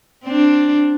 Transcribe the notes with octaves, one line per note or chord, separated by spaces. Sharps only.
C4 D4